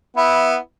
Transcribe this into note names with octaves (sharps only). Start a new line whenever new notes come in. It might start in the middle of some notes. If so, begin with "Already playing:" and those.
B3 E4